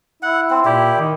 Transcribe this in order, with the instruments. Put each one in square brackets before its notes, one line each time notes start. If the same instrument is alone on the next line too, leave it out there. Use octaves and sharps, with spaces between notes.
[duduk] E4 [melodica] F#5
[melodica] C4
[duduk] A#2 [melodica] E4 G4
[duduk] D#3